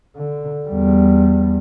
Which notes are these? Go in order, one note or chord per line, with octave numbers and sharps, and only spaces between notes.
D3
E2 G3